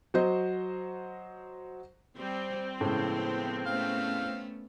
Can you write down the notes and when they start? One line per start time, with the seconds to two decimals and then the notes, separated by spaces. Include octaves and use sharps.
0.14 F#3 F#4 C5 D#5
2.18 G3 C4
2.80 A2 C#3 F3 G#3 B3 E4
3.66 A3 B3 C#4 F5